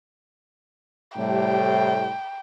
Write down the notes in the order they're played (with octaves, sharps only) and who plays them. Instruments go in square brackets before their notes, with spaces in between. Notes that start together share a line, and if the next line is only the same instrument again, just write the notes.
[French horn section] A2 C3 G3 [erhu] G5